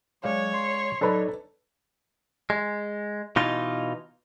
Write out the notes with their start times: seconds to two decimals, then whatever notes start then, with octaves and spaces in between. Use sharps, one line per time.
0.24 F#3 G#3 C#5 D5 F5
0.54 C6
1.01 F#3 D4 D#4 A4 B4 B5
2.50 G#3
3.36 B2 E3 D#4 F4